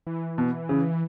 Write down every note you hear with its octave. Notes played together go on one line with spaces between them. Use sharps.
E3
B2
C#3